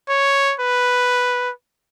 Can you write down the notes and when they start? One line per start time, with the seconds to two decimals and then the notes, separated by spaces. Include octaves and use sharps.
0.09 C#5
0.60 B4